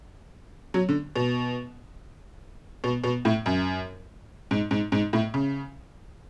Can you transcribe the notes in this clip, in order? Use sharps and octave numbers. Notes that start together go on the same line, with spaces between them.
F#3
D3
B2
B2
B2
A2
F#2
G#2
G#2
G#2
A2
C#3